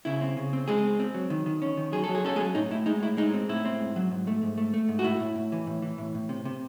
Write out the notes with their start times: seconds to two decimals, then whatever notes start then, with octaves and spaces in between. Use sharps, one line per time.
0.05 C#3 E4
0.21 C4
0.37 C#3
0.53 C4
0.68 G#3 C4 G#4
0.83 C4
1.00 C4
1.14 F#3
1.30 D#3
1.46 D#3
1.62 C#4
1.77 D#3
1.92 F#3 G#4
2.04 A4
2.09 F#3
2.15 G#4
2.25 C#4 A4
2.36 G#3 G#4
2.40 F#3
2.55 A2 D#4
2.71 A2 E4
2.86 G#3 D#4
3.02 A2 E4
3.17 G#3 D#4
3.34 C4
3.49 A2 E4
3.65 C4
3.80 G#2
3.96 F#3
4.11 G#2
4.27 A3
4.43 G#2
4.58 A3
4.74 A3
4.89 G#2
4.99 F#4
5.04 A2 E4
5.20 A2
5.36 A2
5.52 E3
5.67 A2
5.82 E3
5.98 A2
6.15 A2
6.29 C3
6.45 C3